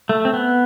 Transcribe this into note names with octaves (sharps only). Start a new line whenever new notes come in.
A3
C4
B3